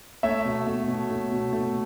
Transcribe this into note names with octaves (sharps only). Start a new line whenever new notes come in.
A3 C#5 E5
B2
A3
B2
A3
B2
A3